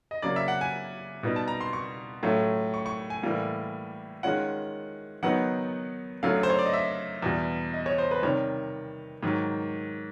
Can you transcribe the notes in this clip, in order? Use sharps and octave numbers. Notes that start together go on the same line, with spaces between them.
D#5
C#3 F#3 A#3 D5
E5
F#5
G#5
B2 G3 B3 D#4
A5
A#5
C6
C#6
A2 F#3 A3 C#4 F4
C#6
C#6
G#5
A2 E3 G3 A#3
D#3 G#3 C#4 F4 F#5
D#3 F#3 B3 D#4 F#5
F#2 D3 F#3 A3 F5
C5
C#5
D5
D#5
E5
E2 B2 G3
D#5
C#5
C5
B4
C3 D#3 G3 C#5
G#2 D#3 F#3